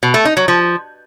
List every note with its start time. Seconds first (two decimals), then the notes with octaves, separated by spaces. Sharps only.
0.03 B2
0.14 A3
0.25 D#4
0.37 F#3
0.48 F3